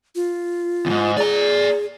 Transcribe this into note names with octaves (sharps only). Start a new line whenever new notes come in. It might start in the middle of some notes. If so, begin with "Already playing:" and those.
F4
E2 G#2
G#4 D5 A#5